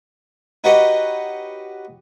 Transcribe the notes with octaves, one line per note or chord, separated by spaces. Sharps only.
D#4 F#4 G4 B4 C#5 D#5